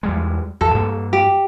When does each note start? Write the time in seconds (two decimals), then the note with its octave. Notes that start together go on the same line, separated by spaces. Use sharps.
0.03 E2 G3 G#3
0.61 E2 A4
0.74 G2 A#3
1.13 G4